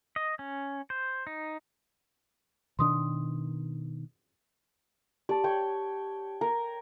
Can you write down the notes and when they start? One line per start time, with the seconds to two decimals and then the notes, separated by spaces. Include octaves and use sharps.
0.16 D#5
0.39 C#4
0.90 C5
1.27 D#4
2.79 B2 D#3 D4 C6 D#6
5.29 G4 D5 A5
5.44 C#5 G5
6.41 A#4